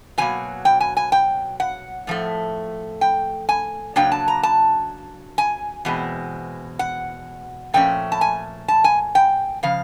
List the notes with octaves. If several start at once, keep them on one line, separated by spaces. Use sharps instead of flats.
B2 F#3 A#3 G#5
G5
G#5
G#5
G5
F#5
A2 F3 A3
G5
G#5
C#3 F#3 A#3 D4 G5
A5
A#5
A5
G#5
E2 B2 G#3 C4
F#5
A#2 F3 A3 C#4 G5
A5
G#5
A5
G#5
G5
C#3 F3 F5